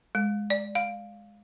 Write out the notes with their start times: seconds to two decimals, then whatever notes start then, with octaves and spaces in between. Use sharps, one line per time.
0.15 G#3
0.50 D5
0.75 F5